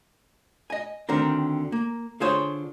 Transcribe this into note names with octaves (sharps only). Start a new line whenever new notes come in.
D#5 G#5
D2 D3 D#3 C4 A#4
A#3
D3 F4 G#4 C5 C#5